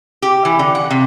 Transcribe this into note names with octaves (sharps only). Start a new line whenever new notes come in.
G4
E3
D3
F#5
C3